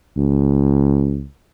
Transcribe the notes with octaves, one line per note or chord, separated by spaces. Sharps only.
C#2